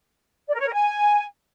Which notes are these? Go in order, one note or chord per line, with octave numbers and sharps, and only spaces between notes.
D5
A#4
C#5
A#4
G#5